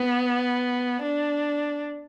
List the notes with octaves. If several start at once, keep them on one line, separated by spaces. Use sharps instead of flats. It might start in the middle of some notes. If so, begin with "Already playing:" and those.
Already playing: B3
D4